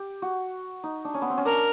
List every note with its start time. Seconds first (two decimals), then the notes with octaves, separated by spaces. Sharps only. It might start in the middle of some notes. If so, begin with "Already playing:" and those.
Already playing: G4
0.22 F#4
0.84 D#4
1.05 D4
1.14 C#4
1.22 B3
1.30 C4
1.38 C#4
1.45 D4 A#4